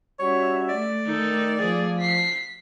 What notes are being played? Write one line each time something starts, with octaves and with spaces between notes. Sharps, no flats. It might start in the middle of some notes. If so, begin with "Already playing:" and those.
G3 C#4 F#4 C#5 E5
A3 D5
D#3 D#4 A4
F3 G#4
B6 C7